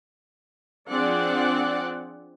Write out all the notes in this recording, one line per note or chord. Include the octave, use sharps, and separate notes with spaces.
F3 C4 D4 G#4 D5 F#5